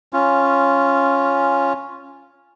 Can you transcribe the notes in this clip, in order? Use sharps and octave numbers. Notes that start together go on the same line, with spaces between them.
C#4 F4